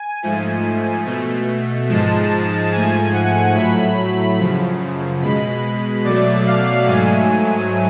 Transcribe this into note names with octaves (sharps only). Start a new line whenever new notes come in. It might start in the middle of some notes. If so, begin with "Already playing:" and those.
Already playing: G#5
G#2 F3 A3
B2 A3
G#2 F3 G#3 A5
G#2 F3 A3 G#5
F#5
A2 F#3 A3 B5
F#2 C#3 F3
B2 G#3 B5
B2 F#3 A3 D5
F5
G#2 F#3 A3 G#5